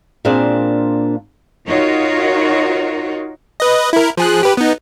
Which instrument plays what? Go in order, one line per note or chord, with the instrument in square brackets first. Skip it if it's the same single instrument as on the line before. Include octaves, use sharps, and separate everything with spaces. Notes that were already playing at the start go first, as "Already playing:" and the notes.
[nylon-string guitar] A#2 A#3 C4 D4 G#4 F5
[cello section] D#4 F4 F#4 A#4 C#5
[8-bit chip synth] B4 D#5
E4 A#4
F3 G#4 F#6
G4 B4
B3 D#4